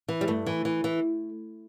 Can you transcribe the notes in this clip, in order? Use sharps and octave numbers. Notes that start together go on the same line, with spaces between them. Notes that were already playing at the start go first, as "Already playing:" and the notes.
E3
G3
G2 A3
E3
E3
E3